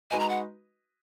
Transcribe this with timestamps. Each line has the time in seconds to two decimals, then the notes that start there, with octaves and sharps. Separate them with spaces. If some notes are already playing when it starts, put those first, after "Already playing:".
0.11 G#3 D#4 F#4 B4 D#5 G#5
0.20 A#5
0.29 F#5